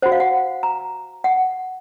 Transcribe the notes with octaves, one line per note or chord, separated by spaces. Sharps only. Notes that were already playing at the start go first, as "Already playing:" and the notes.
F#4 C5 F#5
F5
F#5
A#5
F#5